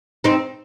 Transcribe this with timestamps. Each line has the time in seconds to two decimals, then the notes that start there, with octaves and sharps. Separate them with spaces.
0.24 C4 D#4